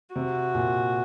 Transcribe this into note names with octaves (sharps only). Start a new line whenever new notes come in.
C3 F#4
A#2